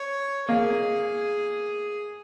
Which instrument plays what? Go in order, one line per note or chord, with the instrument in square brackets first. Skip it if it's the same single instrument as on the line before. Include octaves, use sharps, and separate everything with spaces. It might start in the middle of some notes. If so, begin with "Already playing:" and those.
Already playing: [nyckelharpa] C#5
[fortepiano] A#3 [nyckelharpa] G#4